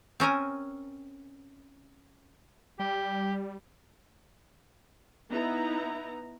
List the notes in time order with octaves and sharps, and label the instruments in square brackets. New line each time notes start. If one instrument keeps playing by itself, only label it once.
[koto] C4 C#4 A#4 G#5
[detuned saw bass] G3 [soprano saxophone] G4
[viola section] B3 D#4 E4 A#5